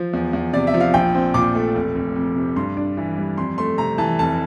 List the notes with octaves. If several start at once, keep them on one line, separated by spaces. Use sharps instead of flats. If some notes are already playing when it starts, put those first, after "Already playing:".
Already playing: F3 C5
E2
E2
C3 D5
E5
F3
F5
A#1 G5
C4
A#2 D6
A3
F1
F1
F2
C3
G2 C6
D4
E3
G3
F2 C6
A3 C6
C3 A#5
E3 A5
F1 A5